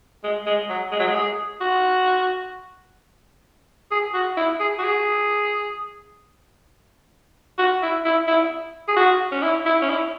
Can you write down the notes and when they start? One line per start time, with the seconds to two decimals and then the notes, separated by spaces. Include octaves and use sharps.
0.24 G#3
0.46 G#3
0.69 F#3
0.92 G#3
0.99 F#3
1.07 G#3
1.15 G#4
1.61 F#4
3.91 G#4
4.14 F#4
4.37 E4
4.60 G#4
4.79 F#4
4.84 G#4
7.58 F#4
7.83 E4
8.05 E4
8.27 E4
8.88 G#4
8.97 F#4
9.32 C#4
9.42 E4
9.66 E4
9.82 C#4
9.89 E4